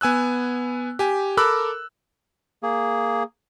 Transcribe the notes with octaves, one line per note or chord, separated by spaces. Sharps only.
B3 G#5 E6 F#6
G4 G#5
A4 A#4 B5 D6 E6 F#6
A#3 G#4